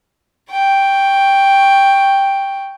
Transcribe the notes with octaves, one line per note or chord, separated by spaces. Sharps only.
G5 C#6